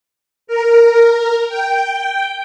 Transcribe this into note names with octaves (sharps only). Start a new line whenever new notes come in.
A#4
G5